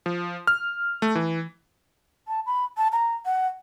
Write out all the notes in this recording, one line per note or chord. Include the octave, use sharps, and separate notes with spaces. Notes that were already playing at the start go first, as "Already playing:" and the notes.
F3
F6
A3
E3
A5
B5
A5
A#5
F#5